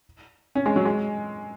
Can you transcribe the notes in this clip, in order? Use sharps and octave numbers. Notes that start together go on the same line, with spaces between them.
C#4
G#3
F#3
G#3